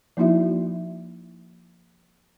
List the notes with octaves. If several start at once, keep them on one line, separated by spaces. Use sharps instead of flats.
F3 A#3 D#4 E4 F#4 E5